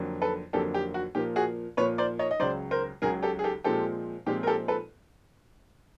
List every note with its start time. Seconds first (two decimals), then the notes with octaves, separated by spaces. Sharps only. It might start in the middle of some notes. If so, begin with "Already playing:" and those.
Already playing: F2 D3 F#3 A#3
0.22 A4 B4
0.53 F2 D3 F#3 A#3 G4 A4
0.74 G4
0.94 F#4
1.15 A#2 F3 A#3 G4
1.36 F#4 G#4
1.77 A#2 F3 A#3 B4 C#5
1.98 C5 D5
2.19 C#5 D#5
2.31 D#5
2.40 C#2 C#3 F#3 C5 D5
2.71 A#4 C5
3.02 C#2 C#3 F#3 G#4 A#4
3.23 G4 A4
3.39 G#4
3.44 G4 A4
3.64 A#2 F3 G#3 C4 G4 A4
4.26 A#2 F3 G#3 C4 G4
4.43 A#4
4.47 G4 A4
4.68 A4 B4